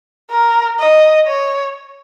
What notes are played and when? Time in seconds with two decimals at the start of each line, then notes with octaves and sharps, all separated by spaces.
0.30 A#4
0.79 D#5
1.27 C#5